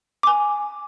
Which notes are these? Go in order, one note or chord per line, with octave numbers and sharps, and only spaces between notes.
G#5 D6